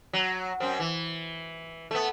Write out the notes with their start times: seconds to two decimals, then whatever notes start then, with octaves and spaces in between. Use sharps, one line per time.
0.13 F#3
0.60 F#2 C4
0.80 E3
1.91 A3 B3